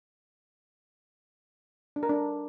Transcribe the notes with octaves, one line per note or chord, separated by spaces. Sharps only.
D4
A#4
D4